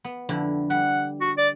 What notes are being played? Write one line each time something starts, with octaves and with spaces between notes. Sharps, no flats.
B3
F2 D3 E4
G3 F#5
F#4
D5